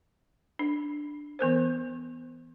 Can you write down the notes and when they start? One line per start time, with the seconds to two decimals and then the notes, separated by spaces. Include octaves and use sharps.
0.59 D4
1.39 E3 B3 A#4 C5